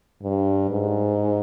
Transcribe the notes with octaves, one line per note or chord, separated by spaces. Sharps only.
G2
G#2